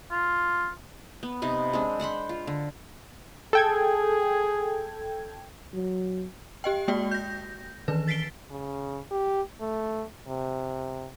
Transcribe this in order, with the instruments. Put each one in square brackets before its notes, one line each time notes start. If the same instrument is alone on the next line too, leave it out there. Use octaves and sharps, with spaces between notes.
[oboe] F4
[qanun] B3
C3 B3 D#4
G#3 C4 D4
C5 F#5 B5 C6
F4
D3
[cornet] G#4 [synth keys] A4 G5 G#6
[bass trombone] F#3
[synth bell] G4 D#5 G5
G#3 A#3 F#4 D5 G5
G6 A#6
D#3 E3 B4
A6 B6 C7 D7 G7
[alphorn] C#3
G4
A3
C3